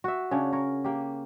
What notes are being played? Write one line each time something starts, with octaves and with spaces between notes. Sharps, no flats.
F#4 E5
C#3 C#4 D4
A#4 C#5
A#3 G4